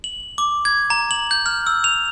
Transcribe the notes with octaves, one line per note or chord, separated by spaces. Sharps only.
F#7
D6
G#6
A#5
F#7
G6
F6
E6
F7